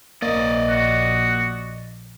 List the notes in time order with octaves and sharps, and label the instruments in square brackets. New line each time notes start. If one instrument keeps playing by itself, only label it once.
[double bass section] A#1 [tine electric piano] A#3 [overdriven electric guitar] D5 D#5
[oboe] F#4